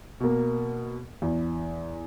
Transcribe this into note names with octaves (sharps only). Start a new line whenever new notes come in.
B2 A#3
E2